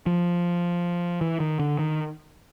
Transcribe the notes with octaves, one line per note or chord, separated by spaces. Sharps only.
F3
E3
D#3
D3
D#3